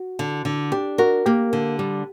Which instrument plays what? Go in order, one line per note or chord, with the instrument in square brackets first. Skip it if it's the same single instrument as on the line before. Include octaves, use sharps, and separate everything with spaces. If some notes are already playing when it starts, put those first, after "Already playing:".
Already playing: [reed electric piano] F#4
[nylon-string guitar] D3
D3
[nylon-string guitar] D4 [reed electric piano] G4
[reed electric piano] F#4 [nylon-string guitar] A#4
[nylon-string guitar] A#3 [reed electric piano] G4
[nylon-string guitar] D3
G3